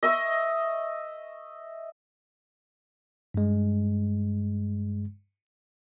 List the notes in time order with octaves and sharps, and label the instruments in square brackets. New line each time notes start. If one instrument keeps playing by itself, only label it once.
[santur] D#5 E5 C#6
[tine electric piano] G2 G#3